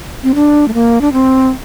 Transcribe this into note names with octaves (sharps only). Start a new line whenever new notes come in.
C4
D4
A3
A#3
D4
C4